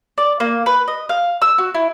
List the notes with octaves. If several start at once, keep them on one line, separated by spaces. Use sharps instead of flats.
D5
A#3
B4
D#5
F5
E6
F#4
E4